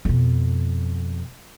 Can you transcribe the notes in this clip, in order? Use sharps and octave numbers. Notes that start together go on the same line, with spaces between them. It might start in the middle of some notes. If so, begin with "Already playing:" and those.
F2 B2